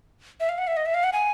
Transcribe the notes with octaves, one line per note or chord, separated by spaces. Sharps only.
E5
F5
F#5
E5
D#5
E5
F5
F#5
G#5